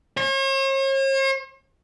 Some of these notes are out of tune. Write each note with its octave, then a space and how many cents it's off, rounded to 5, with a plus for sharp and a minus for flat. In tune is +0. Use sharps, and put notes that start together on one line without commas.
C#5 -45